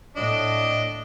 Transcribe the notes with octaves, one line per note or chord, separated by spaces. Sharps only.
A2 D4 D#5